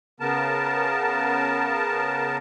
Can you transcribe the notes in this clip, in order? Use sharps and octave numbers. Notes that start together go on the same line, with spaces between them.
C#3 B3 A#4 A5